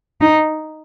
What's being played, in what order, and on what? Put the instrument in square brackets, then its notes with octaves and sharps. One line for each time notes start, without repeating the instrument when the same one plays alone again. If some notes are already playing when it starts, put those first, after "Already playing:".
[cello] D#4